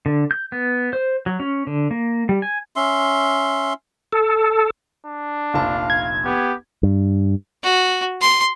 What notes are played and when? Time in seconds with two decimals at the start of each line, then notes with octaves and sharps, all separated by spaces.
0.06 D3
0.31 G6
0.52 B3
0.93 C5
1.26 F#3
1.40 C#4
1.67 D3
1.91 A#3
2.29 G3
2.42 G#5
2.76 C#4 E5 C6
4.12 A4
5.06 D4
5.54 F1 A#1 F5 A5
5.90 G#6
6.25 B3 G4
6.83 G2
7.64 F#4
8.21 C6